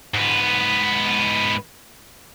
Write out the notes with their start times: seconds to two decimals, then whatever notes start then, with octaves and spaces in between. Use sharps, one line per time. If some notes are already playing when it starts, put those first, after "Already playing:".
0.14 G#2 B3